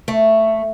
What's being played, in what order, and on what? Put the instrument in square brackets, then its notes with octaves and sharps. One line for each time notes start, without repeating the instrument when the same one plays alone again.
[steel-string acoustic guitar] A3